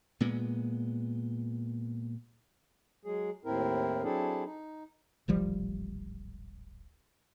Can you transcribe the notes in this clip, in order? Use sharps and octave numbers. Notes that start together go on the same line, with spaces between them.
A#2 G#3 B3
F#3 G#3 G#4
D#2 A2 C4 E4 A#4
F#3 C4 D4 E4 G#4 A4
D#4
D1 G#1 F3 G3